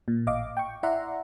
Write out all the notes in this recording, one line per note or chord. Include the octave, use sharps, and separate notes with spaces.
A#2
A1 D#5 F5 D6
G5 C#6
E4 D5 E5 F#5 A#5 C6